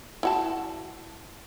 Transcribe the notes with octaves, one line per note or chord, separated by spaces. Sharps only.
E4 F#4 A5